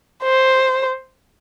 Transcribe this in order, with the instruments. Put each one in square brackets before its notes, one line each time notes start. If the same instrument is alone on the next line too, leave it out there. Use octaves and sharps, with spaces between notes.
[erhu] C5